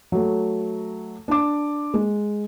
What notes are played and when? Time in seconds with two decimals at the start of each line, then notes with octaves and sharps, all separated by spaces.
0.12 F#3 A3
1.28 D4 D6
1.94 G#3